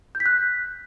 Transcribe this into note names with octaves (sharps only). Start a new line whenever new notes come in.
G6
B6
F#6